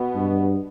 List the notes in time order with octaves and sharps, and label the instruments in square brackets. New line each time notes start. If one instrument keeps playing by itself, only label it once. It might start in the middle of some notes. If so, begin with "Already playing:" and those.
Already playing: [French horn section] B2 B3
[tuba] G2